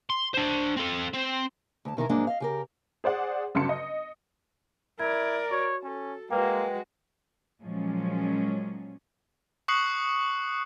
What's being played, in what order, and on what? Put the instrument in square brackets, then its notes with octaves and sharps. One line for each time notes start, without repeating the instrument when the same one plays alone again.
[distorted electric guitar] C6
D4 C5
C4 A4
C4
[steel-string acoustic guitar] D2 A5
B2 D#3 E3 A#4
G#2 F3 F#3 G#3 A#3 D4
D#5 F5
C#3 G4 A#4
[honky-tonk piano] G#4 C5 D5 F#5
G1 C#3 F#3 A5 C6 C#7
D#5
[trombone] E4 [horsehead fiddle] A#4 D5 [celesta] G#6
[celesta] F#4 [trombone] C#5
[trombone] C#4 [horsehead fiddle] A4
[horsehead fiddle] G#3 F#4 [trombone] A#3 [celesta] B4 G5
[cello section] A#2 F3 F#3 G#3 C#4
[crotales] C#6 D#6 F#6 C7 C#7 F#7